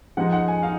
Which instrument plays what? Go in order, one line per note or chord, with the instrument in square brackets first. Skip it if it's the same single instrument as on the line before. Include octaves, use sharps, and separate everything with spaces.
[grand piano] F3 G#3 D#4 F#5
F#5
G#5
D#4 F5